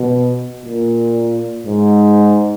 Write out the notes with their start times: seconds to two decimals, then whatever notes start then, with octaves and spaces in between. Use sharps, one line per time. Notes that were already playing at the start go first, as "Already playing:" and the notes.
Already playing: B2
0.65 A#2
1.67 G#2